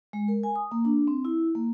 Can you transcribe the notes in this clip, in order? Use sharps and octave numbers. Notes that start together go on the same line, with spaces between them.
G#3
A#4
G#5
D#6
A#3
D4
C4
E4
A#3